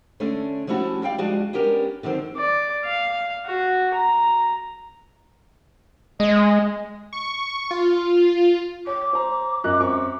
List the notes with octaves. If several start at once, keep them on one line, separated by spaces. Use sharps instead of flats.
D3 A3 C#4 D4
F3 G3 A3 C#4 E4 F#4
D5 F5 G5
F3 G3 G#3 D4 F#4
B3 C#4 D4 G4 A#4
D3 D#3 F#3 C4
D5
F5
F#4
A#5
G#3 D#5
C#6
F4
C#5 D6
C5 A#5
F#2 D#5 F#6
F#2 C4 C#6